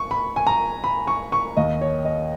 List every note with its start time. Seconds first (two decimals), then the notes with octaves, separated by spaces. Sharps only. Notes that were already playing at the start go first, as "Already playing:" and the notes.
Already playing: C#6
0.11 B5
0.36 G#5
0.47 A#5
0.84 B5
1.07 C#6
1.32 C#6
1.57 D#2 D#3 D#5
1.81 C#5
2.05 D#5